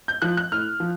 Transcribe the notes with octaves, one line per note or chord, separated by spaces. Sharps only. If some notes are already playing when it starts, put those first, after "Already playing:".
G6
F3 F#6
F#6
A2 F6
F3